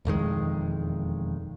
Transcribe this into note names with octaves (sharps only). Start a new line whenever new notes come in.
E1 F2 D#3 G#3